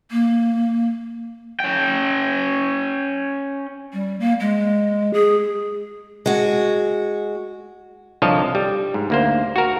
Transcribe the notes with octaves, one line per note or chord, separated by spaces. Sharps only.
A#3
C#4 G5
G3
A#3
G#3
G#4
G#3 F#4
C2 D3 F3 C#5 D#5 A5
G3
G#2
D2 A#3 C5
F#4 A#4